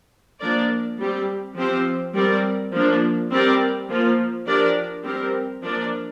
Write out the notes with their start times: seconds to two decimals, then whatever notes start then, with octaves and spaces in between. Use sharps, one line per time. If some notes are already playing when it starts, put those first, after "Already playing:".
0.40 F3 A#3 D4 A#4 D5
0.98 G3 C4 G4
1.56 F3 C4 G4 C5
2.15 G3 C4 A#4 D5
2.72 F3 A#3 D4
3.31 G3 C4 G4 A#4 D5
3.89 F3 A#3 F4
4.46 F3 D4 G4 A#4 D5
5.04 G3 C4 G4 A#4
5.62 F3 A#3 D4 A#4 D5